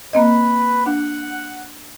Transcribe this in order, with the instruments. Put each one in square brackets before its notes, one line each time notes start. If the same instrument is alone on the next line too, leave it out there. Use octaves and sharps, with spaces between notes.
[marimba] A#3 C4 D#5 [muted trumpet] B4
[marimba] D4 [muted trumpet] F#5